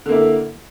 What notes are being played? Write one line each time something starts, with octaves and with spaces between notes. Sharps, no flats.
D3 A#3 E4